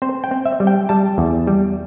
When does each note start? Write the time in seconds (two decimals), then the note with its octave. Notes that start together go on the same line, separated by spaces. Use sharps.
0.02 C4 C5
0.24 G5
0.31 C4
0.45 E5
0.60 G3
0.67 G5
0.89 G3 A5
1.18 E2
1.47 G3